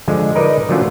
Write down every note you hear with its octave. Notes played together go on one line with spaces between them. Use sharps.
D3 F3 G#3
D#4 A#4 B4 D5 D#5
D3 F3 F#3 A3 C#4 F4